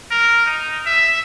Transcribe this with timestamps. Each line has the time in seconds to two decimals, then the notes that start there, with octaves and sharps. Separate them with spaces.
0.11 A#4
0.46 D#4
0.86 E5